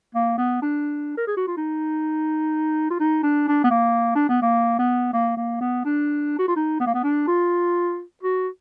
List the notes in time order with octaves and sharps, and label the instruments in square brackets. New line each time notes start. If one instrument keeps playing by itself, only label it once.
[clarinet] A#3
B3
D4
A#4
G#4
F#4
F4
D#4
F4
D#4
D4
D4
B3
A#3
D4
B3
A#3
B3
A#3
A#3
B3
D4
F#4
F4
D#4
B3
A#3
B3
D4
F4
F#4